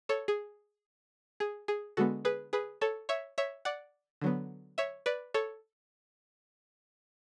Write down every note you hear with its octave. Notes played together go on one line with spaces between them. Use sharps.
A4 C#5
G#4
G#4
G#4
D3 G#3 B3 F#4 A4
G#4 B4
G#4 B4
A4 C#5
C#5 E5
C#5 E5
D5 F#5
D3 F#3 B3
C#5 E5
B4 D5
A4 C#5